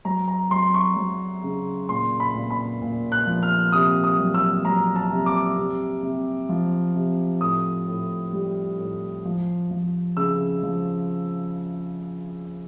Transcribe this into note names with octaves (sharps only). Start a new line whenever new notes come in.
F#3 A#5
A#5
F#3 C6
C#6
F#3
C#3
A#2 C6
B5
A#2
B5
A#2
F#6
F3
F6
C3 D#6
D#6
F#3
E6
F#3 A#5
A5
C3
D6
C3
C3
F3
C3
A2 D#6
A2
G3
A2
F3
F3
C#3 E6
F3